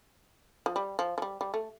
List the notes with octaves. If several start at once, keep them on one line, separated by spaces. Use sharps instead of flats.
F3
G3
F3
F3
G3
G3
A3